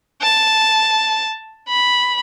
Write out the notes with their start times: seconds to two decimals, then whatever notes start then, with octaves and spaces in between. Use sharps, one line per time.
0.22 A5
1.69 B5